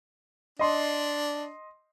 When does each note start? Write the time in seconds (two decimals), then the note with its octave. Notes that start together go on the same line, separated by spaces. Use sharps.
0.59 D4 D#5 C6